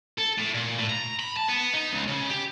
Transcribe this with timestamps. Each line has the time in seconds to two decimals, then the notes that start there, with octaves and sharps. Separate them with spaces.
0.18 A4
0.38 A2
0.54 A#2
0.78 A2
0.90 A#5
1.20 B5
1.36 A5
1.48 B3
1.73 D#4
1.91 C#2
2.08 C#3
2.30 G4